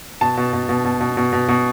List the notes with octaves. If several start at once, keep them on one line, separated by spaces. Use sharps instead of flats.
B2 A5
B2
B2
B2
B2
B2
B2
B2
B2